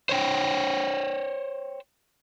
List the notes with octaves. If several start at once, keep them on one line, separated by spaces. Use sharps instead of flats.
C5 C#5 G5